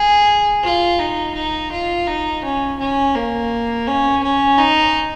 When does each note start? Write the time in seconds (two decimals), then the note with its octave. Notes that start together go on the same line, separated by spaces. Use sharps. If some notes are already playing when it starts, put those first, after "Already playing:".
Already playing: G#4
0.64 F4
0.99 D#4
1.35 D#4
1.71 F4
2.07 D#4
2.43 C#4
2.79 C#4
3.15 A#3
3.87 C#4
4.23 C#4
4.58 D#4